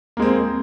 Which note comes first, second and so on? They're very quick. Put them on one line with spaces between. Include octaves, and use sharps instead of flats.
A#3 G#3 C4